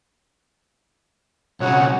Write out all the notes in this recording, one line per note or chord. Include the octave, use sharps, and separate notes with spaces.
B1 C#3 F#4 C#5 F#5